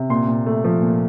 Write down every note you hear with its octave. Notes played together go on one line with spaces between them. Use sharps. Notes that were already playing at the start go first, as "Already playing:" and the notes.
Already playing: C3
A#2 C6
A#2
A3
F3
A#2